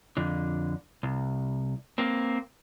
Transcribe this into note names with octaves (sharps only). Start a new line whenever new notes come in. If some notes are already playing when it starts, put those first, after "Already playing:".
F2 D3
C2
A#3 C4